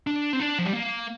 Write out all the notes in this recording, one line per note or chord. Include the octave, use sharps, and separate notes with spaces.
D4
C4
D4
F3
G3
A#3